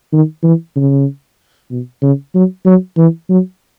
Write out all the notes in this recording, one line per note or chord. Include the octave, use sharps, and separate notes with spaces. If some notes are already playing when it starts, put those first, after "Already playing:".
D#3
E3
C#3
B2
C#3
F#3
F#3
E3
F#3